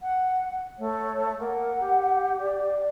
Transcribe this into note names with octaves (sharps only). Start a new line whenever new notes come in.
F#5
A3 C#5
A#3 F#5
G4
D5